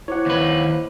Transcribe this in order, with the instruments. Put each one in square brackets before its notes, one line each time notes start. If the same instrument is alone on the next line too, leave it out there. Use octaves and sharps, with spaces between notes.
[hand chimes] E4 C5 D6 [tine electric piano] C#5 F#5
[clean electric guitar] D#2 B4